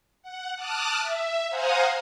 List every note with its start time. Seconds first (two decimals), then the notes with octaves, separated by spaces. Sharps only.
0.22 F#5
0.56 A5 D6 D#6 F6 F#6
0.99 E5
1.49 C5 F5 F#5 G#5 A#5 D#6